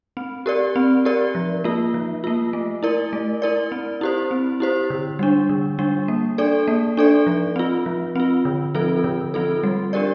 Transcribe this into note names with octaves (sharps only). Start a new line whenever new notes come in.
C4
G4 A#4 D5
C4
G4 A#4 D5
F3
A#3 F4
F3
A#3 F4
A3
E4 A#4 D5
A3
E4 A#4 D5
C4
E4 G4 C5
C4
E4 G4 C5
D3
G3 D4
D3
G3 D4
A#3
D4 A4 D5
A#3
D4 A4 D5
F3
C4 F4
F3
C4 F4
D3
F3 C4 F4 A4
D3
F3 C4 F4 A4
G3
D4 G4 A#4 D5